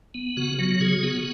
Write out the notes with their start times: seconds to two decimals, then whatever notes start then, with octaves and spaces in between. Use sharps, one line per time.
0.14 B3
0.37 C#3 F#4
0.58 F#3 F#4
0.80 C#3 G#4
1.03 B3 F#4